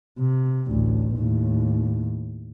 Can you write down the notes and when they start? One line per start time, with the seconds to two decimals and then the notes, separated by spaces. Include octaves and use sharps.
0.19 C3
0.68 A1 D2
1.17 D#2 A2